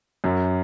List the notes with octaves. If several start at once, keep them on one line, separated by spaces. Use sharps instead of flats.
F#2